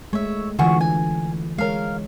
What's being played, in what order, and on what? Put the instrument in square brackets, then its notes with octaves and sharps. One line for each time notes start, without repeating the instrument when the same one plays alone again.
[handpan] G#3 A3 [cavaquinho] C#5 E5
[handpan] D3 E3 F4 [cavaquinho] F#4 G#4 C#6
[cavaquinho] G#5
[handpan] G#3 C#5 [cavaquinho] A#4 F5